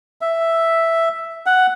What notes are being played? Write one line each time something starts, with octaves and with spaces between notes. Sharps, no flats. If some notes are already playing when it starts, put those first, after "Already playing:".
E5
F#5